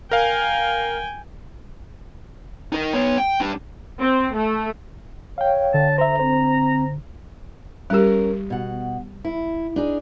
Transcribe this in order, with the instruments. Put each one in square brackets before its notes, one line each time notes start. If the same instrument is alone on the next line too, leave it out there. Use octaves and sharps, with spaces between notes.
[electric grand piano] A#4 F5 [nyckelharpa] G5 G#5
[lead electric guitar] D#4 A#4
B3 C#5
G5
G3 D4
[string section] C4
A3
[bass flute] C#5 [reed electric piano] F5 G5
[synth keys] D3 [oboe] A5
[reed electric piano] C5 E5 [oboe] A#5
[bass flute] C4 [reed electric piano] C5
[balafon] G3 G4 [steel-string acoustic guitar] C#4 A#4
[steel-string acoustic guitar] B2 F#5
E4
D4 D#4 G#4